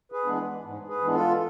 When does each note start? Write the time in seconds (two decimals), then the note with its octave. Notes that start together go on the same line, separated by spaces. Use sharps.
0.12 G#4 B4
0.25 E3 G#3 B3 D4
0.64 G#2
0.89 G#4 B4
1.01 E3 G#3 B3 D4
1.15 F4 A4